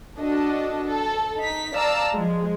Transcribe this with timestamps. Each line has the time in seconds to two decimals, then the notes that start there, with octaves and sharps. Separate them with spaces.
0.19 D4 F#4 A4 D#5
0.87 A4
1.38 D#4 B6
1.74 D5 F5 A5 A#5 E6
2.16 F3 G#3